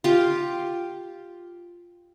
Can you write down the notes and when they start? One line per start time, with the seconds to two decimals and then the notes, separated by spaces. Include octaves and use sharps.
0.04 F4 G4